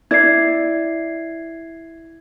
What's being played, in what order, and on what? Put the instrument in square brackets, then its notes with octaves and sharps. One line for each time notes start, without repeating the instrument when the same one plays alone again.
[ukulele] E4 D5 [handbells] G#6 C7